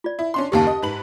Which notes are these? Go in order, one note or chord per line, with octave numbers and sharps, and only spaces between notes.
F4 D5
E4
C#4 D4 C6
F#1 D#2 A#3 G4 F#5 A5
D#5
G#2 B4 F#7